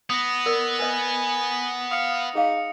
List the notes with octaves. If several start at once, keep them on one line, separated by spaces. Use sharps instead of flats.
B3 D#6 A#6
A#4 D5
B4 D#5 G#5
F5 D#6 C#7
D#4 G#4 F5